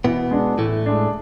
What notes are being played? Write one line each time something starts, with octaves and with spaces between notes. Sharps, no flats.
B2 E3 B3
G#3 D4
A2 E3 A3
G#3 D4